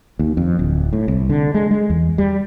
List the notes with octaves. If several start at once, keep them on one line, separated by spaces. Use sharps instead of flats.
D#2
F2
D1
A2
C2
D3
G#3
G#3
E2
G3